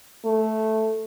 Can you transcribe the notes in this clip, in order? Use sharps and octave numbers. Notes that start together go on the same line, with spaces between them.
A3